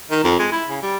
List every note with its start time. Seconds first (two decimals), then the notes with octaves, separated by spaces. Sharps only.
0.11 D#3
0.24 F2
0.39 G#3
0.52 E4
0.69 C#3
0.82 G3